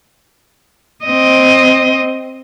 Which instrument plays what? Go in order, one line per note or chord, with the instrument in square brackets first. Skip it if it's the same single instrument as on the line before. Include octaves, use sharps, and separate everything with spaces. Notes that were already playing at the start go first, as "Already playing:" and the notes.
[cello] C4 D#5